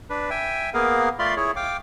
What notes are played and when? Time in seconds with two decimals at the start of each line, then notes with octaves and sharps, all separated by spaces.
0.10 D4 B4
0.30 E5 G5 G#5
0.74 A#3 B3 G#4 A#4 F5
1.19 A3 F4 D5 F5 B5 C6
1.37 E4 G#4 C#5
1.56 F5 G5 D6